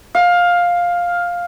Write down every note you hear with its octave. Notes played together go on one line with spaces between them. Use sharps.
F5